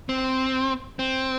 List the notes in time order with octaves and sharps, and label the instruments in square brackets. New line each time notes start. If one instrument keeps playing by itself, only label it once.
[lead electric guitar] C4
C4